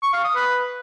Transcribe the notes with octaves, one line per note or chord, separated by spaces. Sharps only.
C#6
F5
D#6
B4